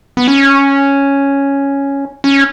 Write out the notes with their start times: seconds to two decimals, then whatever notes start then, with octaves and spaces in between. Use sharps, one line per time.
0.17 B3
0.28 C#4
2.24 C#4